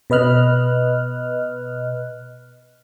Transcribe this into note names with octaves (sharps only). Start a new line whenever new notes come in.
B2 B4 D#5 F6 F#6